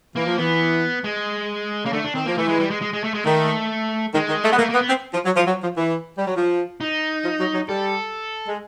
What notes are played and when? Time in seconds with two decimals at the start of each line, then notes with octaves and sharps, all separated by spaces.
0.16 E3 A#3
0.27 F3
0.38 E3 B3
1.04 G#3
1.85 C#3 A#3
1.93 D3 A3
2.04 D4
2.15 D#3 C4
2.26 F3 A#3
2.38 E3 A3
2.48 G#3
2.60 G3
2.70 G#3
2.82 G#3
2.93 G#3
3.04 A3
3.14 G#3
3.25 D#3 A3
4.14 D#3 G#3
4.29 D#3
4.44 A3
4.53 B3
4.59 A3 A#3
4.70 A#3 B3
4.81 B3
4.89 C4
5.14 F3
5.26 F#3
5.36 F3
5.47 F#3
5.63 F3
5.77 E3
6.18 G3
6.27 F#3
6.36 F3
6.81 D#4
7.25 F3
7.39 F#3
7.54 F#3
7.69 G3 A4
8.48 G#3